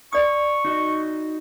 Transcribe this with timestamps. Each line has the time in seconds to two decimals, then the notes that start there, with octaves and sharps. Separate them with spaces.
0.13 D5 C#6 D#6
0.65 D#4 F#4 D#5